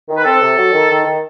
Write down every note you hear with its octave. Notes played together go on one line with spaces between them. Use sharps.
D#3
B4
C4 A4
C3
F#3
D#3
D#3
D#3